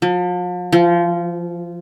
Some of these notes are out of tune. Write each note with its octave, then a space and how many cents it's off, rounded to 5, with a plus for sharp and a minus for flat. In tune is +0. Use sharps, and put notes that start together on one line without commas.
F3 +40
F3 -20